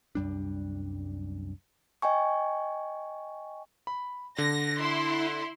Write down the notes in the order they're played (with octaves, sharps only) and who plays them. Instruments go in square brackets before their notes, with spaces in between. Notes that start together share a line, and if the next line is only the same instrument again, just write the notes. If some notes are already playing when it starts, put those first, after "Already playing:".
[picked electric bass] C2 F#2 G3 D4
[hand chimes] D#5 G5 G#5 C#6
[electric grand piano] B5
[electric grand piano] D3 [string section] A#6
[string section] E4 C6